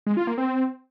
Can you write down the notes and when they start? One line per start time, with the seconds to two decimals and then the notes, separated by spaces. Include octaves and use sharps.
0.07 G#3
0.17 F4
0.27 A#3
0.38 C4